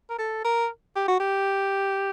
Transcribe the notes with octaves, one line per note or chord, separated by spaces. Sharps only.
A#4
A4
A#4
G4
F#4
G4